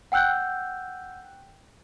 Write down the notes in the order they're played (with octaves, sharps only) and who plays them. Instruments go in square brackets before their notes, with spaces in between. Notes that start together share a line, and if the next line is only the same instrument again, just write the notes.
[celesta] F#5 G5 E6 F#6 G6